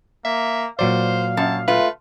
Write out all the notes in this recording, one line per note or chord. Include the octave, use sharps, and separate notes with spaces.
A#3 E5
A#2 F#3 C5 D5 F5
F#2 A5
A3 F4 B4